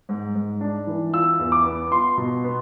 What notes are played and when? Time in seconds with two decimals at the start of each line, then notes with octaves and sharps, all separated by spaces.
0.09 G#2
0.35 G#2
0.61 D4
0.87 E3
1.13 F4 E6
1.39 E2
1.52 D6
1.65 B3
1.91 F4 C6
2.18 B2
2.44 B3